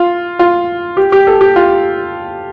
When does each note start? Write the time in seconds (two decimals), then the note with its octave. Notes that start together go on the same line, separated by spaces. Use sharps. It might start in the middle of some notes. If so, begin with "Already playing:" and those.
Already playing: F4
0.39 F4
0.97 G4
1.12 G4
1.27 A4
1.41 G4
1.56 F4